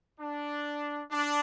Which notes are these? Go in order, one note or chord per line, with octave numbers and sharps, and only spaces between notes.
D4
D4